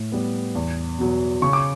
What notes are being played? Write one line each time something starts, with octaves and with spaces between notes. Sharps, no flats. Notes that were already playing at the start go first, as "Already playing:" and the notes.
Already playing: A2
G3 B3
E2
B2 F#3 B3
C#3 C#6
D6